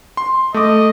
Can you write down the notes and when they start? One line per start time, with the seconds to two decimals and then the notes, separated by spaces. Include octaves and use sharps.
0.17 C6
0.54 A3 D#5 D6